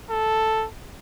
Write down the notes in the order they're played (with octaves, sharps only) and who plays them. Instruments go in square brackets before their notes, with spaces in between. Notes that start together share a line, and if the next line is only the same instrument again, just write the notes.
[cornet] A4